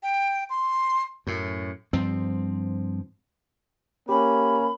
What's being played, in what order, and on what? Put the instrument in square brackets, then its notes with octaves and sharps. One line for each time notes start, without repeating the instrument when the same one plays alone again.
[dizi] G5
C6
[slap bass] F#2 A2
G2 F3 C4
[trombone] A#3 [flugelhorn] C#4 [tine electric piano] G4 [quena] B5